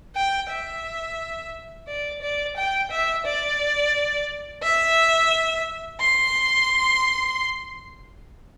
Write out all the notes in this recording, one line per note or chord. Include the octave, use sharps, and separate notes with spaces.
G5
E5
D5
D5
G5
E5
D5
E5
C6